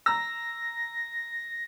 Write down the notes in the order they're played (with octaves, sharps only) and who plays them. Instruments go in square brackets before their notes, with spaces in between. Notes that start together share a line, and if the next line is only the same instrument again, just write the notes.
[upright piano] A#5 E6 [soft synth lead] A#6